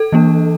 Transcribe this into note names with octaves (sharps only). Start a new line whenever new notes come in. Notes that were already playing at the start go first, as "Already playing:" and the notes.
Already playing: A4
E3 A#3 D4